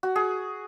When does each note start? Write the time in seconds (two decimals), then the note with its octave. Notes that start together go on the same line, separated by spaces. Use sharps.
0.03 F#4
0.16 G#4